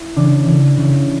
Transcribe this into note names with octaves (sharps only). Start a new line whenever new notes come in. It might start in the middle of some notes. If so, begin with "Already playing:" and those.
Already playing: E4
C#3 E3 D4
C#3 E3 E4
C#3 E3